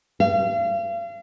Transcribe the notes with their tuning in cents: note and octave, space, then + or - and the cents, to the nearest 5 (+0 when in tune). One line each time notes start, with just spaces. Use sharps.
F5 -40